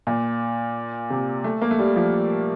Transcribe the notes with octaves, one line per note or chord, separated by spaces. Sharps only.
A#2
C3
A3
A#3
A3
G3
F3